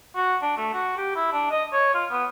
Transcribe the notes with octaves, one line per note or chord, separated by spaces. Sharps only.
F#4
D4
A3
F#4
G4
E4
D4
D#5
C#5
F4
B3